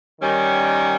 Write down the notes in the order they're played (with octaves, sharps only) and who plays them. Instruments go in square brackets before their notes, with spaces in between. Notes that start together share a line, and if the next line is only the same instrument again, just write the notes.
[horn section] D#3 G3 C#4